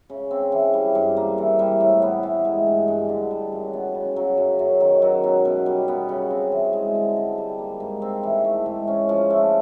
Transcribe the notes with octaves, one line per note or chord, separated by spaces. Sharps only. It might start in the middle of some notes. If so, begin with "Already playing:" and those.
C#3
C4
E3
G3
G2
A#3
E3
G3
A2
B3
E3
G#3
G2
G2
D3
G3
F#2
B3
C#3
F#3
F#2
F#2
D#3
F#3
B2
B2
G3
B3
C#3
C4
E3
G#3
D3
D3
G3
A#3
G#2
C4
E3
A3
G#2
C#4
F3
A3